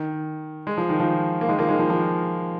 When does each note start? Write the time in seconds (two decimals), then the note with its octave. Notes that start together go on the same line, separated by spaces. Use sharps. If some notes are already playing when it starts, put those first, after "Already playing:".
Already playing: D#3
0.67 G#3
0.78 F3
0.89 D#3
1.00 F3
1.41 A#3
1.48 D#3 G#3
1.59 F3 A#3
1.69 D#3 G#3
1.79 F3
1.90 F3